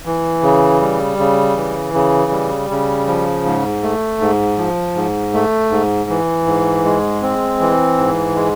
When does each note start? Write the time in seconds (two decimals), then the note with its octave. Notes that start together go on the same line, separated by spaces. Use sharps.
0.05 E3
0.43 C#3
0.81 G3
1.18 C#3
1.56 E3
1.94 C#3
2.31 G3
2.70 C#3
3.07 F3
3.46 G#2
3.83 A3
4.21 G#2
4.58 F3
4.96 G#2
5.34 A3
5.71 G#2
6.10 E3
6.46 G#2
6.85 G#3
7.22 C4
7.60 E3
7.98 G#2
8.36 G#3